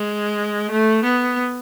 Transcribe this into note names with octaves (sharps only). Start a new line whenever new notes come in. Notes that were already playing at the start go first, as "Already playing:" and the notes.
Already playing: G#3
A3
B3